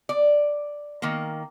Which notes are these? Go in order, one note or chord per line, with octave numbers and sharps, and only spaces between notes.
D5
D#3 A#3